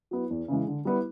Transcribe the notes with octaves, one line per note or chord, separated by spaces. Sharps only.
F#3 B3 E4
E2
C#3 E3 G#3
D3
G3 B3 E4